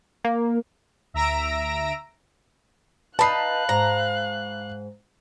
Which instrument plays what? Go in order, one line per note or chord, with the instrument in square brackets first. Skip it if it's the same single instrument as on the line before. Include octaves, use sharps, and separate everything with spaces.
[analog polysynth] A#3
D2 E5 A#5 E6 A#6 D7
[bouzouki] D#4 B4 [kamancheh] F5 F#6 [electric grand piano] A5 B5 C7
[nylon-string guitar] G#2 [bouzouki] A#5